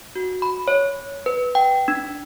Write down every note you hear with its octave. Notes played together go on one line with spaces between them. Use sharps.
F#4
B5
C#5
B4
G5
D4